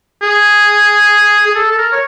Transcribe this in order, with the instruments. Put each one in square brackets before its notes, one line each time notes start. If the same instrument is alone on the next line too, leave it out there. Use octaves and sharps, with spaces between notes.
[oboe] G#4
G#4
A4
A4
A#4
C#5